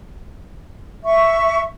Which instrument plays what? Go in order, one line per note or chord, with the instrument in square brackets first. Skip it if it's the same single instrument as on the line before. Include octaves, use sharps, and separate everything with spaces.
[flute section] E5 C#6